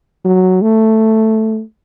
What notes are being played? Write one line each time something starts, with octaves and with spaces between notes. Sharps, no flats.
F#3
A3